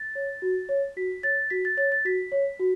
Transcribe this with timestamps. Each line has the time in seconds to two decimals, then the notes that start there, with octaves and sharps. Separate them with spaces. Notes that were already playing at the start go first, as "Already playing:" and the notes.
Already playing: A6
0.15 C#5
0.42 F#4
0.69 C#5
0.97 F#4 B6
1.23 C#5 A6
1.50 F#4 B6
1.65 A6
1.77 C#5 A6
1.92 A6
2.05 F#4 B6
2.32 C#5
2.59 F#4